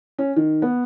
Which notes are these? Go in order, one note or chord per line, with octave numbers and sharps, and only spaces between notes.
C#4
D#3
B3